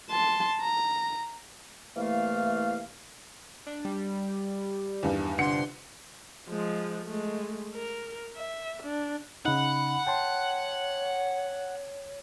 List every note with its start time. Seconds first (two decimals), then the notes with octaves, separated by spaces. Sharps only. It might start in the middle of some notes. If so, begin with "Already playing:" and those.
0.11 A5 C6
0.61 A#5
1.96 C2 E3 A3 A#3 F5
3.67 D4
3.85 G3
5.03 E2 G2 D#3
5.38 G1 C3 D4 F#5 C6 C#7
6.48 F3 G#3
7.06 G#3 A3
7.74 A#4
8.36 E5
8.83 D4
9.45 C#3 D#4 F#5 B5
10.07 C#5 G5 A5 C6